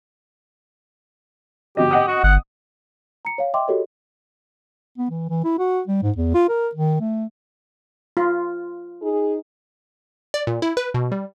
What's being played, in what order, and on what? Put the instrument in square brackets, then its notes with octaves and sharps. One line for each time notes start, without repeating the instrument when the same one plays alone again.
[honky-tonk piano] G1 F#4 D#5 [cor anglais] G4
[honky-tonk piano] D#5 F#5 D#6
[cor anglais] F#4
[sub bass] G1 [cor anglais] F#5
[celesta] A#5 C#7
C#5 F5
D#5 E5 G5 C6 D6
F#4 G4 A4 A#4 C#5 D#5
[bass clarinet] B3
E3
E3
E4
F#4
G3
G#2
E2
F4
A#4
D#3
A3
[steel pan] F4
[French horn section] D#4 G#4
[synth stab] D5
A#2
E4
B4
B2
G3